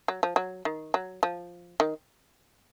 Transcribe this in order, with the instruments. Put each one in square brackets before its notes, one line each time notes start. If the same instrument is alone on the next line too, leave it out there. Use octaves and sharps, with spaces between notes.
[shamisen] F#3
F3
F#3
D#3
F#3
F3
D#3